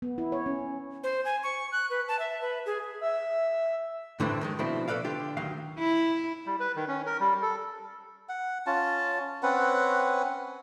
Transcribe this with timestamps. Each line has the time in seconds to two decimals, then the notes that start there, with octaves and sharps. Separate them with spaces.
0.02 B3
0.18 E4
0.32 C#5
0.46 C#4
1.04 C5
1.25 G#5
1.43 C#6
1.72 F#6
1.90 B4
2.08 A5
2.19 E5
2.41 B4
2.66 G#4
3.01 E5
4.20 A2 D3 E3 G3 C4
4.41 D#3 F3 G#3
4.59 B2 F3 A3 C4 D4 E4
4.88 B2 A4 B4 D5 F5
5.04 D3 F4 G4
5.37 D2 D#3 F#3 F5
5.79 E4
6.46 G3
6.60 B4
6.76 D#3
6.88 C#4
7.06 A#4
7.20 G3
7.42 A4
8.29 F#5
8.67 C#4 F4 A5
9.43 C4 C#4 B4 F#5